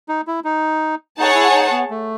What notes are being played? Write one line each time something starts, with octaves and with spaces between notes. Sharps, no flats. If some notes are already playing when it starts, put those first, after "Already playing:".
D#4
E4
D#4
D#4 G#4 C#5 F#5 A5
E4
D#4
B3
A3